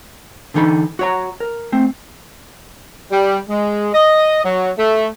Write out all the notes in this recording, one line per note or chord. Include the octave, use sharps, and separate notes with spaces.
D3 E3 D#4 A4 B5
F#4 C#5 A#5
A#4
A3 C4
G3
G#3
D#5
F#3
A3